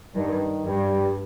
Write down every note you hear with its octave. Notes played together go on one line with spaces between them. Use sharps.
G2 D#3
G2 G3